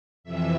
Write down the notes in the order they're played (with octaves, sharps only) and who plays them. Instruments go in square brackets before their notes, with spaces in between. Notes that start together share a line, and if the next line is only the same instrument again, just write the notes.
[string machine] F2 C3 E3 E5